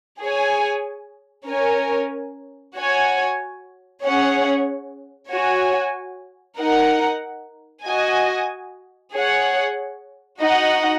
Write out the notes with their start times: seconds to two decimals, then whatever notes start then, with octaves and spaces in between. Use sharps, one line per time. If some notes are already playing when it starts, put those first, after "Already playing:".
0.21 G#4 C#5 G#5
1.49 C#4 A#4 C#5 G#5
2.76 F#4 C#5 G#5
4.03 C#4 G#4 C#5 F#5
5.31 F#4 C#5 G#5
6.58 D#4 A#4 F#5
7.86 F#4 D#5 G#5
9.14 G#4 C#5 F#5
10.41 D#4 F#4 D#5 F#5